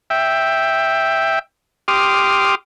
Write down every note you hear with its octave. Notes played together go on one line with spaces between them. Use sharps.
E5 G5
G4 C6 D6 D#6 F6